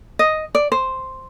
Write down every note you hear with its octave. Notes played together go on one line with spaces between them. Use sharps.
D#5
D5
C5